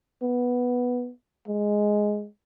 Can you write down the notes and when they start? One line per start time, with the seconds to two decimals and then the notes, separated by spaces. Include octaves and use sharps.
0.22 B3
1.48 G#3